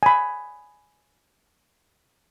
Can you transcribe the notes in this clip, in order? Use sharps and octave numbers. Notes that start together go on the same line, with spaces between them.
G#5 B5